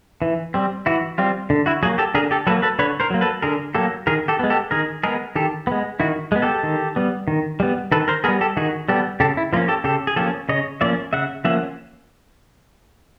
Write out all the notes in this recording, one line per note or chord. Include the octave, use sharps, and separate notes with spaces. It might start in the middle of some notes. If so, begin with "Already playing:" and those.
E3
G3 C4
E3 E4 F#4
G3 C4 F4
D3
E4 F#4
F#3 A#3 F#4 G#4
G4 A4
D3 G#4 A#4
G4 A4
F#3 A#3 A4 B4
A4 B4
D3 B4 C#5
A#4 C5
F#3 A#3
A4 B4
D3 G#4 A#4
F#3 A#3 G4 A4
D#3 G#4 A#4
G4 A4
G#3 B3
G4 A4
D#3 G#4 A#4
G#3 B3 G#4 A#4
D#3 G4 A4
G#3 B3
D#3 E4 F#4
G#3 B3
G4 A4
D#3
G3 B3
D#3
G3 B3
D#3 A4 B4
A#4 C5
G3 B3 G#4 A#4
G4 A4
D#3 F#4 G#4
G3 B3 G4 A4
C#3 G4 A4
E4
F3 A#3 C#4 F4
G4 A4
C#3 G4 A4
G#4
F3 A#3 C#4 G4 A4
C#3 C#5 D#5
F3 A#3 C#4 D5 E5
C#3 E5 F#5
F3 A#3 C#4 E5 F#5